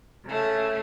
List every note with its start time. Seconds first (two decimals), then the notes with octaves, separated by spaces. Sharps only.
0.24 C#3 A3